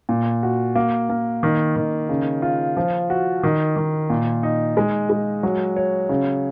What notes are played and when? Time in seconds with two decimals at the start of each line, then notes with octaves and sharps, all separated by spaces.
0.09 A#2
0.43 F#4
0.75 A#3
1.10 A#3
1.43 D#3
1.76 D#3
2.09 C#3
2.42 F4
2.77 F3
3.10 F#4
3.43 D#3
3.76 D#3
4.10 A#2
4.43 D#4
4.77 G#3
5.10 G#3
5.43 F#3
5.76 C#5
6.09 C#3